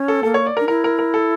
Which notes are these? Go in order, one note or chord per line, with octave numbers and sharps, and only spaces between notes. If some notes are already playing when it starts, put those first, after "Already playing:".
Already playing: C#4
A4
A#3 A4
C#5
D5
A#4
D4
E4 A#4
A#4
A#4
A4